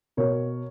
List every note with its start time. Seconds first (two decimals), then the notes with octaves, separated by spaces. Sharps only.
0.17 B2 A#4 C#5